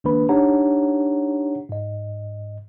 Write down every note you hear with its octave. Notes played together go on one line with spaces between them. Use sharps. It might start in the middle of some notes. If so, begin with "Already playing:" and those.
C#2 D#3 A#3 D4 B4 B5
D4 D#4 G4 C#5 F#5 A#5
G#2 D#5